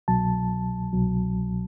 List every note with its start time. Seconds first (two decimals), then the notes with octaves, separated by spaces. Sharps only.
0.08 C2 B2 F#3 A5
0.93 C2 B2 F#3